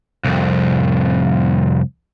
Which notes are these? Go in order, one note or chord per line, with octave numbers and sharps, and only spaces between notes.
C2 F2